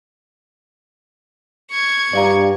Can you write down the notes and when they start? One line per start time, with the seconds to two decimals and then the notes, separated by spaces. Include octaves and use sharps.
1.71 C#6 G#6
2.13 G2 D5 F5 A#5